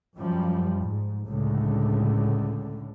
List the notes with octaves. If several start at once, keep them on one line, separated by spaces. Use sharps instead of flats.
F#2 F3 G3
G#2
C#2 A2 D3